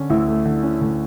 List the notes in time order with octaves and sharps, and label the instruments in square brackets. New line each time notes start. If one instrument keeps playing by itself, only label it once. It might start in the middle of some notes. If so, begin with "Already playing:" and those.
Already playing: [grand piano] D3 C#4
[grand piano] D2 [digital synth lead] E4
[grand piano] A3
D3
C#4
D2